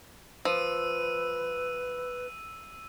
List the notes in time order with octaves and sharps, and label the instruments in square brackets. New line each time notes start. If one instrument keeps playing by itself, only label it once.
[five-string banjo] F3 [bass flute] B4 [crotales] E6 D#7